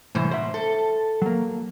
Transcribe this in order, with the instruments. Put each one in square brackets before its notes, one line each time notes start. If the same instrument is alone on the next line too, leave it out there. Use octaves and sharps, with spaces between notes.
[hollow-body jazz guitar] C2 A2 [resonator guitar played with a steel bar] F#2 E3 C5
[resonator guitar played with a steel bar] B2 [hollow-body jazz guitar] C5 E5
[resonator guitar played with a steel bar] A4
[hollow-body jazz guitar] F#3 A#3